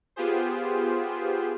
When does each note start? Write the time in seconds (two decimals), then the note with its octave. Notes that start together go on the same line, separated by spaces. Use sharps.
0.16 B3 F4 G4 G#4 C5